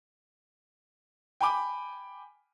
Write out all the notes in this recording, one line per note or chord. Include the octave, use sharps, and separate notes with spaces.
G5 G#5 B5 D6